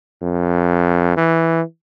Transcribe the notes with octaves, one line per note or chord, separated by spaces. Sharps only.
F2
E3